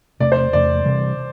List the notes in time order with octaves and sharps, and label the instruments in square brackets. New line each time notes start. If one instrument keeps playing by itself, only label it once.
[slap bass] E2 C3 A3 [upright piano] D5
[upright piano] C5
[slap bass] E2 C3 A3 [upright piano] D5
[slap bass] C3 E3 G3